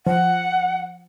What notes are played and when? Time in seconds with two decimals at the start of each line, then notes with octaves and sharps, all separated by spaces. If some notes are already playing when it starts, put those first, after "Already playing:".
0.06 F3 F#5